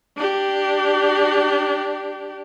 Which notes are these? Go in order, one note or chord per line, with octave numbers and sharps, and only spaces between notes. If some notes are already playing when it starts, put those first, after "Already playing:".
D4 G4